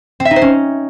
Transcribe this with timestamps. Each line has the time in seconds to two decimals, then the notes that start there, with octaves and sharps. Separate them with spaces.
0.20 C4
0.25 E5
0.31 D#4
0.36 C5
0.42 C#4